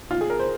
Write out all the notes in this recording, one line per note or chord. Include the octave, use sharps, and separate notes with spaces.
F4
G#4
A#4
C5